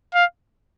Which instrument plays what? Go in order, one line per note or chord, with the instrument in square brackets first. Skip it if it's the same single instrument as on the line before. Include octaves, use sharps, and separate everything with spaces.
[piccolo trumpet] F5